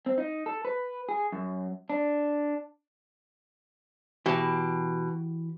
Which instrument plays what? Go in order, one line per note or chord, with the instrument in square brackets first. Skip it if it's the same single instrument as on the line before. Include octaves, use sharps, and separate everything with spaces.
[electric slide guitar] C4
D#4
A4
B4
G#4
F#2
D4
[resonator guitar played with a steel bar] B2 [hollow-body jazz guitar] E3 G4